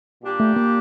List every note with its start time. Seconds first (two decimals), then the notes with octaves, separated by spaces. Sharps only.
0.22 A#2 G3 D4 G4
0.40 A3
0.56 A#3